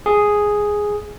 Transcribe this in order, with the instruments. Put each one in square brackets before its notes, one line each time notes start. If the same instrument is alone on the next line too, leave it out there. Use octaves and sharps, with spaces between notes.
[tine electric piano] G#4